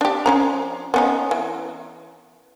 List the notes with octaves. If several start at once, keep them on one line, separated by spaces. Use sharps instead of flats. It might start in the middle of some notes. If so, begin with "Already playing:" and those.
D4 G4
F3 C#4 A#5
B3 C#4 D#4
E3